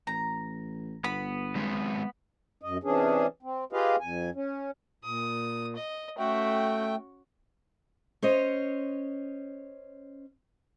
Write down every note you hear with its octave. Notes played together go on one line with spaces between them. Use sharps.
A1 A#5
G1 B3 B5
F#3 G#3 C4
F#2 D#5
C3 E3 C#4 D4 G#4
C4
F4 G4 G#4 B4 D#5 F5
F2 G#5
C#4
A#2 D#6
D#5
A3 C#4 F#4 E5 G5
C#4 C5 C#5 D#5